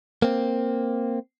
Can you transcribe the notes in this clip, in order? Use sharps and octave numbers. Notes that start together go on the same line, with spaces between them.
A#3 C4